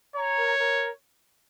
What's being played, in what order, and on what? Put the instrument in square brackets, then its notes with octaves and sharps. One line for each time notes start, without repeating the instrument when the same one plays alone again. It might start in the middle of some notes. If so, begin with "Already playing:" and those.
[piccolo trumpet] C#5 [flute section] A#5
[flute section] A#4
A#4